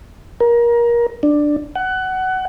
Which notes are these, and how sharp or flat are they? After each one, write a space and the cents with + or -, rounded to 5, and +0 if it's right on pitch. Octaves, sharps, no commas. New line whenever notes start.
A#4 +25
D4 +10
F#5 +20